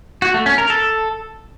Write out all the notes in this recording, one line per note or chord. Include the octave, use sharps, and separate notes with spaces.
F#4
A3
C#4
A#4
A4